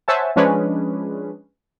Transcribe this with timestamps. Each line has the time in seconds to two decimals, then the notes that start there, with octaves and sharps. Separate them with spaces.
0.08 C5 C#5 E5 F#5 G#5 A5
0.36 F3 G#3 C#4 D4 G#4 B4